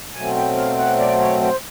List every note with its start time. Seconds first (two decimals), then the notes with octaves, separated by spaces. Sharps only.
0.15 B2 F#3 A3 C4 G#5
0.36 G5
0.56 F5
0.78 F#5
0.99 D5
1.20 C#5
1.41 C5